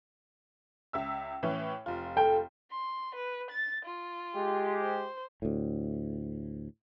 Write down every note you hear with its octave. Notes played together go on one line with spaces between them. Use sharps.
C#2 E5 E6
A2 E3 C#4
F1 F4
A4 G5
C6
B4
A6
F4
G#3 G4
C5
D2 A2